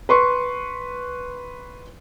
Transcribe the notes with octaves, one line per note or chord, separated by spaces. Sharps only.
B4 C6 C#6